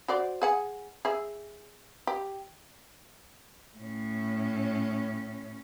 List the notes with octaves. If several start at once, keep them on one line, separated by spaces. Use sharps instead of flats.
F#4 C5 D5
G#4 F#5 G#5
G#4 E5
G4
A2 C#4